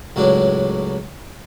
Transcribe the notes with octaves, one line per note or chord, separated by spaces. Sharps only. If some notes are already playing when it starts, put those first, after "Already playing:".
C#2 A2 F#3 D4